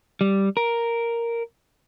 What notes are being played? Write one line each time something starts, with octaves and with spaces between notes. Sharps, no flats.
G3
A#4